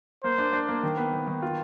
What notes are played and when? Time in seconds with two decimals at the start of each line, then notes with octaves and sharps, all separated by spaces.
0.24 A#3 C5
0.38 D4
0.53 D4
0.68 A#3
0.83 D#3
0.97 B3
1.13 D#3
1.27 D#3
1.42 F4